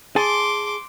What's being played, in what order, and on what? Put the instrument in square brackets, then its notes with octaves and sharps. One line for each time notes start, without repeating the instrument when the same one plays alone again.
[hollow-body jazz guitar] G#4 G#5 A5 [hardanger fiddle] C6 D6